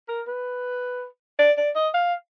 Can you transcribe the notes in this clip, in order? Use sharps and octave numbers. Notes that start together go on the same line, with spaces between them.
A#4
B4
D5
D5
D#5
F5